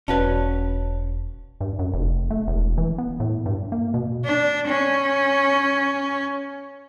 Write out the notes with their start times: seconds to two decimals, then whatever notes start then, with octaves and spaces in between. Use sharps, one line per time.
0.08 E1 C#4 F#4 B4 D5 F5 A5
1.61 G2
1.79 F#2
1.94 F1
2.30 A3
2.48 E1
2.78 E3
2.98 B3
3.20 A2
3.46 G2
3.72 A#3
3.94 B2
4.25 D4
4.67 C#4